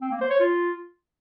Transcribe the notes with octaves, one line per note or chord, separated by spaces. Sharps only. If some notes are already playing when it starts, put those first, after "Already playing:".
C4
A#3
C5
C#5
F4